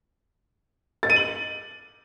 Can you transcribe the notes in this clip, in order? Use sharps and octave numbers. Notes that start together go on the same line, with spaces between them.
A6
D#7
F#7